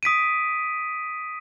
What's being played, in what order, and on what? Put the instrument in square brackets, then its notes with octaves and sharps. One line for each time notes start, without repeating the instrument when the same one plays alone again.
[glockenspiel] D#6 B6 D7 D#7